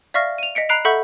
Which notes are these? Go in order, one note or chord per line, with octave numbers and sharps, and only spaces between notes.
D5 E5 F5 C#6 F6 A#6
D#7 F7
D#5 B6 C#7 D7
A#5 B5 F#6 C7 D7 F7
A4 E5 F#5 B5 C#6 G6